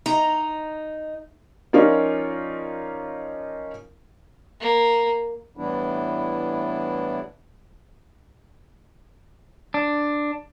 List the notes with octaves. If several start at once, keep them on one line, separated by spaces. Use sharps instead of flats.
D#4 A#5
F3 C#4 D#4 F4 A#4 D5
A#3
A2 E3 G3 B3 D4 E4
D4